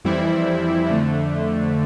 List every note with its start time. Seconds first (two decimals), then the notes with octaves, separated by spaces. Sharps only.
0.05 F2 E3 G3 C4 E4
0.89 F2 D3 A3